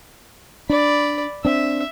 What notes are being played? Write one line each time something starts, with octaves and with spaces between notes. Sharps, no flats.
D4 D5 B5
C4 D4 E5